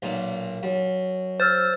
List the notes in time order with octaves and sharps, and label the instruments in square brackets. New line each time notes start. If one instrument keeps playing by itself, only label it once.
[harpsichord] B1 A#2
F#2
[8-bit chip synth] C5 [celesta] E6 F6 A6